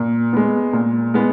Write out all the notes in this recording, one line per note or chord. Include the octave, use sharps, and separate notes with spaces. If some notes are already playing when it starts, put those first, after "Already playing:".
Already playing: A#2
G#3 B3
A#2
G#3 B3